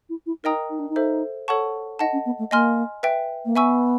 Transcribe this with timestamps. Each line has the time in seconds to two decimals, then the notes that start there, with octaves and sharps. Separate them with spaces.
0.09 E4
0.26 E4
0.44 D#4 A#4 D#5 G5 A#5 D#6
0.70 D#4
0.79 D4
0.89 D#4
0.96 A4 C5 E5
1.48 A4 C#5 F#5 A5 C#6
1.99 D#4 D#5 F#5 A5
2.12 C#4
2.25 B3
2.39 A3
2.51 A#3 D#5 G#5 C6 F6
3.03 B4 E5 G5
3.45 A#3
3.55 B3 E5 G#5 C#6 E6